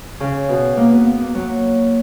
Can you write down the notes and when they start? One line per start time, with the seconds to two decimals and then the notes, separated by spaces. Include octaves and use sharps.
0.20 C#3
0.49 B2
0.77 A#3
0.92 B3
1.06 B3
1.21 A#3
1.35 F#3